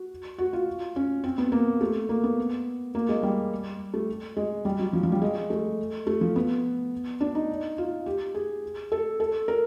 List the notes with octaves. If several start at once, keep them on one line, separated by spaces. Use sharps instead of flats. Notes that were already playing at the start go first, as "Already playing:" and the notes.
Already playing: F#4
F#4
F4
C#4
C4
B3
A#3
A3
A#3
B3
A#3
G#3
G3
A3
G#3
G3
F#3
F3
F3
G3
G#3
A3
A3
F3
B3
D4
D#4
F4
G4
G#4
A4
A4
A#4